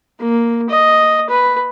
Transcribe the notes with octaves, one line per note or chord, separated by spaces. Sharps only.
A#3
D#5
B4